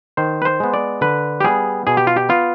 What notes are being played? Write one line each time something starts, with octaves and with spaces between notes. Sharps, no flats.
D#3 C5
B4
C5
G#3 B3
D5
D3 B4
G4
G3 B3 G#4
B2 G#4
G4
F4
G4
B3 F4